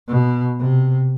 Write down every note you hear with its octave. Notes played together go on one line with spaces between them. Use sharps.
B2
C3